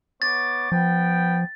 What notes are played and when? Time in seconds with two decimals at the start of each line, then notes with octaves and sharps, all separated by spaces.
0.22 B3 C#5 D6 A6
0.72 F3 B3 G5